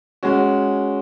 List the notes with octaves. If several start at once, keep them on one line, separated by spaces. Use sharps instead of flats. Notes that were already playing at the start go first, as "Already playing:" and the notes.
G#3 C#4 F#4